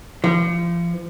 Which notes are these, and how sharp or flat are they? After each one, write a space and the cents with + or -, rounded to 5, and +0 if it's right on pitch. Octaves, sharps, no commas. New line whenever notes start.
F3 -30